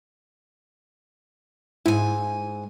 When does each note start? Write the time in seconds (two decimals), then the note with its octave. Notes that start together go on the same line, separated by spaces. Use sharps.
1.86 G#2 E4 G#5